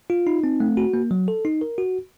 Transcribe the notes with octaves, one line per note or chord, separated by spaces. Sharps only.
F4
D#4
C4
A3
F#4
A#3
F#3
A4
D#4
A#4
F#4